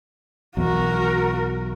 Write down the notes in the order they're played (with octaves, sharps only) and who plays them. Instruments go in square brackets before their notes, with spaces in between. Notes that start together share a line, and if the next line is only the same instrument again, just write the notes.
[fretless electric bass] B1 E2 [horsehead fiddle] F#4 A#4